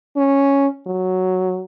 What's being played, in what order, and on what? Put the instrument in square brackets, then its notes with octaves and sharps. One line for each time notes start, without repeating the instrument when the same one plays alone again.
[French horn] C#4
F#3